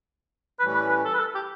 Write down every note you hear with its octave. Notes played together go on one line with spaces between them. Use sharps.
A2 E3 G3 C#4 B4
B4
B4
A4
B4
A4
G4